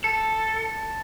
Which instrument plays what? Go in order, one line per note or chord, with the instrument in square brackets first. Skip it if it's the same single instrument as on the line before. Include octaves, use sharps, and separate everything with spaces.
[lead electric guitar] A4 [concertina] A5